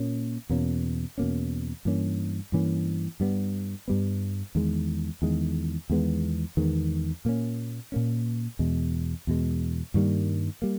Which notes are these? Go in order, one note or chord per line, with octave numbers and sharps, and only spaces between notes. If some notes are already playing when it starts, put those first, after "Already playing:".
Already playing: A#2 A#3 C#4
E2 B2 A#3 C#4
E2 B2 A#3 C#4
G2 E3 A#3 C#4
G2 E3 A#3 C#4
G2 G3 B3
G2 G3 B3
E2 D#3 G#3
E2 D#3 G#3
E2 D#3 G#3 B3
E2 D#3 G#3 B3
A#2 A#3 C#4
A#2 A#3 C#4
E2 B2 G#3
E2 B2 G#3
G2 D#3 G3 A#3
G3 A#3